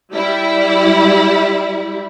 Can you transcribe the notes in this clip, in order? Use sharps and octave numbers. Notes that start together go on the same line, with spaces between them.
G3 E4